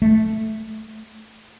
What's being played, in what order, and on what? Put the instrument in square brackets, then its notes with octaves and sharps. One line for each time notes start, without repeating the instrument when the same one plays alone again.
[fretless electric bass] A3